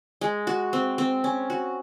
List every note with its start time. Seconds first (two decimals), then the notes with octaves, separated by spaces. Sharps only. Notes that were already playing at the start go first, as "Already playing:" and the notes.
0.21 G#3
0.47 F#4
0.73 C4
0.98 C4
1.24 C#4
1.50 F#4